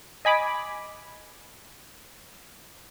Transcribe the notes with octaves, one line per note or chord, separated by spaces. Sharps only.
D#5 G#5 B5 D6